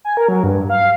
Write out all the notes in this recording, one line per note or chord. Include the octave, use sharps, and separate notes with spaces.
G#5
A#4
F#3
G2
F5